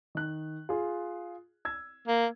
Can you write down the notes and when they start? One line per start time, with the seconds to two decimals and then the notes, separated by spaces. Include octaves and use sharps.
0.15 D#3 F#6
0.69 F4 G#4
1.65 E6 G#6
2.08 A#3